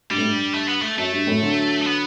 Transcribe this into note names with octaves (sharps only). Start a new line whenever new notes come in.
G2 G3
A2
G2
A3
B3
A3
F#2 A3
G2
F#2 A2
D3 F#3
A3
B3